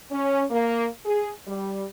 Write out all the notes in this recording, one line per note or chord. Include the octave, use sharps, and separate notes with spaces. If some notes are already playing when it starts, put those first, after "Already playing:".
C#4
A#3
G#4
G3